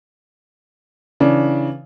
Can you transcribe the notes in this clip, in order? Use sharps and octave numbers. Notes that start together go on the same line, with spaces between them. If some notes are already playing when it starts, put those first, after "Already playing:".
C#3 E3 D4